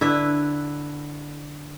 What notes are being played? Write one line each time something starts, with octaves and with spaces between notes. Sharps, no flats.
D3 E4 B4 E5